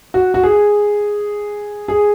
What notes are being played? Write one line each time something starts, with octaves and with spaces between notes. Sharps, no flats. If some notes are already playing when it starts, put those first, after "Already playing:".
F#4
F#4
G#4
G#4